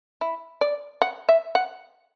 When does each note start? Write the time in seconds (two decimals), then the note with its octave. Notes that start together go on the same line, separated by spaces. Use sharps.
0.21 E4
0.61 D5
1.02 F#5
1.29 E5
1.55 F#5